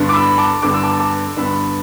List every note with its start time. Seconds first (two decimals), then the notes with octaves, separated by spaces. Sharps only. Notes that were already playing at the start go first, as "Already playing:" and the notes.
Already playing: G2 D3 B3 D4
0.09 D6
0.13 B5 E6
0.38 A5 D6
0.62 G2 D3 B3 D4 D6
0.73 E6
0.83 A5 D6
0.99 A5 D6
1.36 G2 D3 B3 D4 B5 E6